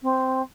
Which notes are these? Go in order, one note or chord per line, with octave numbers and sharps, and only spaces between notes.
C4